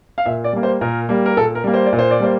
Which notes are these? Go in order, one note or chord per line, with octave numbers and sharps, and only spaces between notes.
F5
A#2 E5
D5
G3 A#3
C5
A#2 A#4
G3 A#3
A#4
A#2 A4
A#4
G3 A#3
C5
D5
A#2
C5
D5
G3 A#3 C5